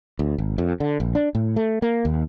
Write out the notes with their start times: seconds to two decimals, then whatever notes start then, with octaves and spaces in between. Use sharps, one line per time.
0.19 D2
0.38 G#1
0.58 F2
0.80 D3
1.00 A#1
1.15 D4
1.35 A2
1.56 A3
1.82 A#3
2.05 D#2